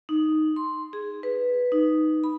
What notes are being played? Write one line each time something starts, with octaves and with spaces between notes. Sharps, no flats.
D#4
C6
G#4
B4
D#4
B5